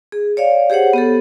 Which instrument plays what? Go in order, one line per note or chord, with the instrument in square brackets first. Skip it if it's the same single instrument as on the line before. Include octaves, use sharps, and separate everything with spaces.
[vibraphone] G#4
C#5 D5 F5
G4 G#4 C5 C#5 F#5
B3 G4 A4